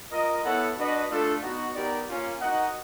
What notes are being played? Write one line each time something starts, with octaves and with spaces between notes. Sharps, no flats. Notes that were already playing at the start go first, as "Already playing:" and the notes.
F4 A#4 D#5
B3 E4 A4 C#5 F#5
D4 F#4 B4 D#5
A3 D4 F4 A4
B3 D#4 F#4
B3 D#4 G4 A#4 D5
A#3 C#4 F4
D#4 F#4 A#4 D#5 F#5